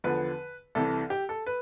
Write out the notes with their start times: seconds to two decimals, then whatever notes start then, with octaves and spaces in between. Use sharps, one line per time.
0.04 E2 D3 F3 B4
0.75 C2 C3 E3 A4
1.10 G4
1.29 A4
1.46 B4